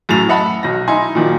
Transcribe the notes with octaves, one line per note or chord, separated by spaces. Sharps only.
F#2 A2 A6 F7
D#5 E5 F#5 A5 B5
B1 A#6
D#4 E4 G#5 C6
A#2 D#3 F3 F#3